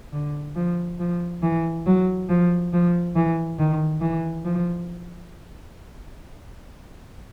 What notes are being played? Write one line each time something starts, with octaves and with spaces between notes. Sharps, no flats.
D3
F3
F3
E3
F#3
F3
F3
E3
D#3
E3
F3